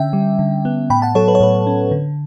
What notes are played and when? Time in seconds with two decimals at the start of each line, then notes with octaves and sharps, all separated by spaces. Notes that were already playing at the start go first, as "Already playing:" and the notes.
Already playing: D3 C#4 E5 G5
0.13 G3
0.39 D3
0.65 B3
0.90 A2 G5 B5
1.02 F#5 A5
1.15 F#3 A4 C#5
1.28 B4
1.35 C#5
1.40 A2 B4
1.67 C#4
1.91 D3